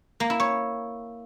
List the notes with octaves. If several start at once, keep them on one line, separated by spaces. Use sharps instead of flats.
A#3
E4
C#5